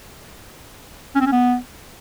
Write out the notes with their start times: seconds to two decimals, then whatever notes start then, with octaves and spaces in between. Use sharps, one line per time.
1.15 C#4
1.21 C4
1.27 C#4
1.32 B3